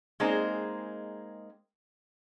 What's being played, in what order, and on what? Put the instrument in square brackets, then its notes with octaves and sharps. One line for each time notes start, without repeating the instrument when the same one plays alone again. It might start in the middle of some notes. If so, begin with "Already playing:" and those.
[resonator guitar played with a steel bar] G#3 A#3 C4 D#4 G#4 C5